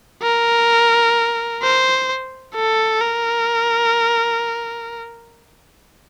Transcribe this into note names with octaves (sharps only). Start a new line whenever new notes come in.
A#4
C5
A4
A#4